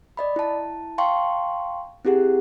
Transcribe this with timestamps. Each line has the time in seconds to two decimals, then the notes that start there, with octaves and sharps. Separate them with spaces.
0.17 D5 D#5 B5
0.36 E4 A5
0.98 F5 G5 A5 C6 C#6
2.05 C4 E4 G4 G#4 F#5